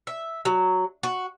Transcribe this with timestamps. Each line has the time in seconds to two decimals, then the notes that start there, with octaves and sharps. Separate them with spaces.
0.07 E5
0.45 F#3
1.03 F#4